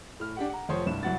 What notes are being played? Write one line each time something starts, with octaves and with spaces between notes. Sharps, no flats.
A2 F6
D4 G4 F#5
F#5 A#5
F1 F3 C5 C#5 C6 D#6
C2 G2 E7
C2 F#3 F#5 A6